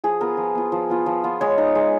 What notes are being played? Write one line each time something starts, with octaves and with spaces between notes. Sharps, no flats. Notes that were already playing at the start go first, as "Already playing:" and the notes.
F3 G#4
B3 F4 A#4
F3
B3 F4
F3
B3 F4
F3
B3 F4
G#3 C#5
D#4
G#3